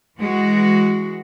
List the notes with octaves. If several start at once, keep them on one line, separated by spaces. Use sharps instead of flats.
E3 G#3 F#4